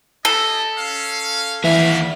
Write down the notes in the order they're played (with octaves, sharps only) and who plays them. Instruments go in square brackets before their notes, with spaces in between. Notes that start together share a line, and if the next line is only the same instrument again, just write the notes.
[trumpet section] E4 G4 D#5 [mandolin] A4
[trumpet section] C#4 F5
[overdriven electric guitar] D#2 E5 [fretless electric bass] E3 [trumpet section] A3 C#4 F5